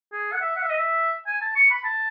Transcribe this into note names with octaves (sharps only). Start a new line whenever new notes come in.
G#4
F#5
E5
F#5
E5
D#5
E5
G#5
A5
C#6
B5
A5